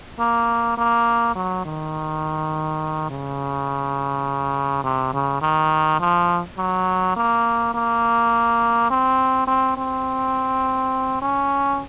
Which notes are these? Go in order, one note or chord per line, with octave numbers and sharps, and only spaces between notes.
A#3
A#3
F#3
D#3
C#3
C3
C#3
D#3
F3
F#3
A#3
A#3
C4
C4
C4
C#4